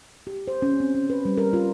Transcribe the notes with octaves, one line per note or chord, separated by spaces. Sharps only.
G4
C5
C#4
C4
C#4
B4
G3
A#4
F4